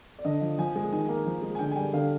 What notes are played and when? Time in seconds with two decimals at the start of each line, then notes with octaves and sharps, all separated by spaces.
0.19 D5
0.25 D3 D#5
0.41 F3
0.58 F3 G#5
0.76 G#3 G#5
0.92 D#3 G#5
1.09 A#3
1.26 F3
1.42 G#3
1.55 G#5
1.59 D3 G5
1.71 G#5
1.76 G3 G5
1.93 D3 F5